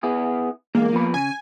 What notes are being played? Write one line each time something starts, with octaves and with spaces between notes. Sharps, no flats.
B3 E4 G#4
E2 G2 G#3 A#3
F3 B3 B5
C#3 G#5